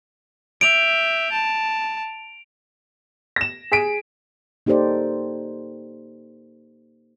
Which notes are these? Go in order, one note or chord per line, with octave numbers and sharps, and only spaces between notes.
E5 G6 D7 F7
A5
A#6 E7
G#4 B6 D7 D#7
A#3 D#4 G4 A4 C5 D5